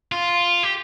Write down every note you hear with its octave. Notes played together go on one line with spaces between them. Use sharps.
F4
G4